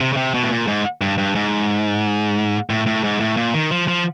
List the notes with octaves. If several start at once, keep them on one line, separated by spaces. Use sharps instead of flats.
C3
C#3
C3
B2
A2
A#2
G#2
G2
G2
G#2
A2
A2
G#2
A2
A#2
D#3
F3
F3